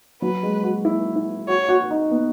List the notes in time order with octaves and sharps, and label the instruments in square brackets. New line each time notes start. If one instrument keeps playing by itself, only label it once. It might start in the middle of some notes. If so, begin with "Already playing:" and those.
[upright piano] F#3 [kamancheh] B4
[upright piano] G#3
F#4
E4
E4
[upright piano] F#4 [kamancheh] C#5
[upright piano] F#4
D#4
B3